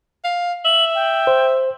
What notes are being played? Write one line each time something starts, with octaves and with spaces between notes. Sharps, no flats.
F5
E5 F#7
G5
C5